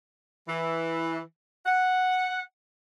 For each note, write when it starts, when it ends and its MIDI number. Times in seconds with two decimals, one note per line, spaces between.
0.48 1.19 52
1.66 2.40 78